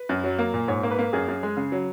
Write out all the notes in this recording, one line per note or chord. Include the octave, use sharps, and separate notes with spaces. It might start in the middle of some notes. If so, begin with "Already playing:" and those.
Already playing: B4
F#2
F#3
A#3
A#2
G#2 C#5
A#3
B4
A#3
F#2 G#4
F#2
G#3
C#3
F#3